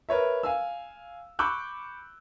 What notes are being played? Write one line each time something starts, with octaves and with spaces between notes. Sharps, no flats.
A#4 B4 C#5 E5
F5 G#5 E6
B5 C#6 D6 E6 F#6 G6